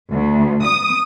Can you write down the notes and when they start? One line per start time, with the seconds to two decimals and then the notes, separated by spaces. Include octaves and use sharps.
0.12 D2
0.64 D#6